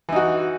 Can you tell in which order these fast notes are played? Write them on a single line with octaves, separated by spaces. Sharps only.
E3 D#4 F#4